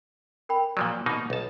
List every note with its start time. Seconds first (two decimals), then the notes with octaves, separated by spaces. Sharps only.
0.49 A#4 G5 B5
0.77 A#2 F3 F#3 D5
1.06 B2 A#3 D#4
1.30 B1 A5